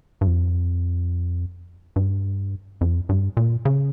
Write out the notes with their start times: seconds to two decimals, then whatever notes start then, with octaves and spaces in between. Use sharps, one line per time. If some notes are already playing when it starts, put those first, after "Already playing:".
0.21 G2
0.27 F2
1.96 G2
2.81 F2
3.09 G2
3.37 A#2
3.65 C#3